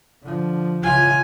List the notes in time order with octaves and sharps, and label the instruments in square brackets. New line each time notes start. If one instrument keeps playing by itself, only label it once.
[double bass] D3 F3
[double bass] C#2 E3 [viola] F4 G#5